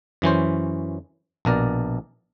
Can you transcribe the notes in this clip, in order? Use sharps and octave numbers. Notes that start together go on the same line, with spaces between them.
F#2 E3 C#4 C5
A#1 B2 A#4 D5